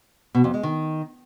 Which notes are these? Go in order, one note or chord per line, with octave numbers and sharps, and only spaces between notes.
B2
F2
G#3
D#3